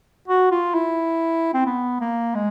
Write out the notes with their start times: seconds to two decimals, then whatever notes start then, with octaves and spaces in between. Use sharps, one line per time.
0.28 F#4
0.51 F4
0.74 E4
1.54 C4
1.66 B3
2.01 A#3
2.35 G#3